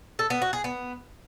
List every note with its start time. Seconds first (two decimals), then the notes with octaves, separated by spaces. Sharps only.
0.19 A4
0.30 B3
0.42 F#4
0.53 G#4
0.64 B3